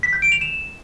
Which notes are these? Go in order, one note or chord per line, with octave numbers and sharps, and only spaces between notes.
B6
G6
D7
F7
E7